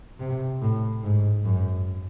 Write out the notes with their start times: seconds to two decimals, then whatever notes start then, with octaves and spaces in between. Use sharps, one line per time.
0.20 C3
0.62 A2
1.03 G#2
1.45 F#2